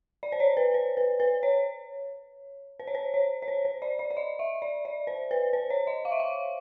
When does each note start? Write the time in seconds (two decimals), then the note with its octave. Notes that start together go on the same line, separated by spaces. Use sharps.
0.23 D5
0.32 C5
0.40 C#5
0.57 B4
0.74 C5
0.97 B4
1.20 B4
1.43 C#5
2.80 C5
2.87 C#5
2.95 C5
3.14 C#5
3.42 C#5
3.48 C5
3.65 C5
3.82 D5
3.99 D5
4.11 D5
4.17 D#5
4.39 E5
4.62 D5
4.85 D5
5.07 C5
5.31 B4
5.53 C5
5.70 C#5
5.87 D#5
6.05 F5
6.12 E5
6.20 F5